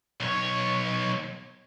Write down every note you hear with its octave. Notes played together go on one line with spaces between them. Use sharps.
B1 C#5